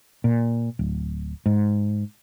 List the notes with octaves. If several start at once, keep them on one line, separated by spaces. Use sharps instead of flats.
A#2
D1
G#2